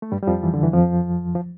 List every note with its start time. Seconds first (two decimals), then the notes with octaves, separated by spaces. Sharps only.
0.02 A3
0.12 G2 G3
0.22 G3
0.27 F2 F3
0.43 E3
0.54 D3
0.63 E3
0.73 F2 F3
1.35 F3